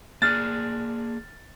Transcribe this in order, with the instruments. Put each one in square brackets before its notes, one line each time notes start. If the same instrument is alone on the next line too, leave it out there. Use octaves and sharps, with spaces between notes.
[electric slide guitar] A#3 G#4 D5 [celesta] F6 F#6 [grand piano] A6